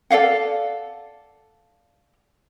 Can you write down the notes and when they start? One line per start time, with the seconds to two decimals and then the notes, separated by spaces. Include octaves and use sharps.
0.10 A4 D5 F5 F#5